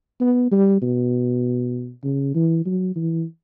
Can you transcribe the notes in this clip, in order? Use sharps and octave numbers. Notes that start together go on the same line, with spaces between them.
B3
G3
B2
C#3
E3
F#3
E3